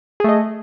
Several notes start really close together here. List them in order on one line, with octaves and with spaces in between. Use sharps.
G#4 A3 D#5